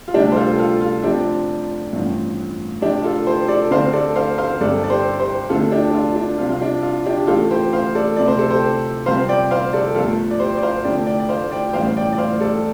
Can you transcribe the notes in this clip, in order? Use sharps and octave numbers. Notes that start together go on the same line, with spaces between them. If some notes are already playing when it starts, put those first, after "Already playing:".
F4
D2 C3 G3 C4 D4 G4
C5
F4 A4
G4
F4 A4
F4
F1 F2 F3 C4 D4 G4
A1 G2 F3 C4
F1 F2 F3 D4 G4
F4 A4
G4 C5
A4 D5
D2 D3 A3 C4 C5 F5
A4 D5
C5 F5
C5 F5
G1 G2 G3 C4 A4 D5
D5
G4 C5
G4 C5
D2 D3 F3 F4 A4
D4 G4
D4
F4
D4
C2 C3 F3 C4 F4
F4
D4
F4
D4 G4
G4
A1 A2 A3 C4 F4 A4
G4 C5
C5 F5
A4 D5
D2 C3 F3 C4 D5
C5
A4
G4 C5
F2 C3 G3 C4 C5 F5
D5 G5
C5 F5
A4 D5
G1 F2 F3 A3 F4 A4
D5
G4 C5
D5
C5 F5
F1 F2 D3 A3 D5 G5
D5 G5
D5
C5 F5
D5 G5
G5
A1 A2 G3 C5 F5
D5 G5
D5
C5 F5
A4 D5